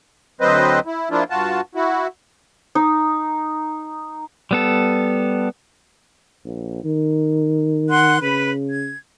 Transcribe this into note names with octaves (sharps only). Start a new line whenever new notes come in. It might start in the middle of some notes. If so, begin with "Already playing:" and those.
D2 F#3 C4 B4 C5 D#5
E4
F3 A#3 D4 E4 F4
G2 F4 F#4 A5
E4 F#4
D#4
G3 B3 A4
A#1
D#3
F#5 C6 F#6
C#3 B4 B5
G#6